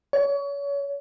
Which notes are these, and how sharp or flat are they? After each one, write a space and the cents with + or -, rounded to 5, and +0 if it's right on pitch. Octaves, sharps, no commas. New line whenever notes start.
C#5 +30